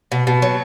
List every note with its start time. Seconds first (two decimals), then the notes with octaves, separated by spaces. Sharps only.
0.12 B2
0.27 B2
0.42 F#3